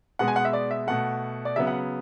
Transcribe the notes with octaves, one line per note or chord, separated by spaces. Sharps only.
B2 G#3 B3 F#5
G#5
F#5
E5
D5
E5
B2 A3 F#5
D5
C#3 F#3 B3 E5
F#5